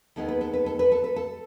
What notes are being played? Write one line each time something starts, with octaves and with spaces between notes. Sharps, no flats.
D#2 D#3 G#3 B3 D#4 A4
B4
A4
B4
A4
B4
A4
B4
A4